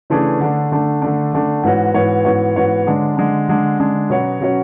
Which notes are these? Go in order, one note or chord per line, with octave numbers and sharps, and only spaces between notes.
C#3 E3 A3 D4 G#4
D3 A3 D4
D3 A3 D4
D3 A3 D4
D3 A3 D4
G#2 E3 B3 F#4 C#5
G#2 E3 B3 F#4 C#5
G#2 E3 B3 F#4 C#5
G#2 E3 B3 F#4 C#5
D3 G#3 D4
D3 G#3 D4
D3 G#3 D4
D3 G#3 D4
B2 F#3 C#4 F#4 C#5
B2 F#3 C#4 F#4 C#5